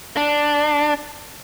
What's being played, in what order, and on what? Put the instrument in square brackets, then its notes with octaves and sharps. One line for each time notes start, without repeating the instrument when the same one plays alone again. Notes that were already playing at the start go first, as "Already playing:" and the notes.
[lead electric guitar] D4